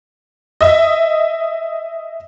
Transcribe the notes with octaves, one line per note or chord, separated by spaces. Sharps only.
D#5 E5